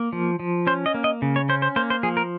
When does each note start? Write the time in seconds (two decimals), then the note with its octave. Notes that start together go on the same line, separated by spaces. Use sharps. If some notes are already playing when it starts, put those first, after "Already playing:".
Already playing: A#3
0.13 F3
0.40 F3
0.67 C#4 C5
0.86 D#5
0.94 A#3
1.04 D#5
1.22 C#3
1.36 C#5
1.49 C#4 C5
1.62 C5
1.76 A#3 C5
1.90 C5
2.03 F3 G#4
2.17 A#4